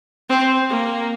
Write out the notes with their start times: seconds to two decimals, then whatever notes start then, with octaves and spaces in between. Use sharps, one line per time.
0.29 C4
0.69 A#3